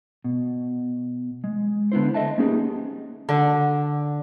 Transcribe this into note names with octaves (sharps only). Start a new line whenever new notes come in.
B2
G#3
D3 B3 E4 C5
A4 C5 D#5 E5 A5
A#3 B3 C#4 D#4 G4 G#4
D3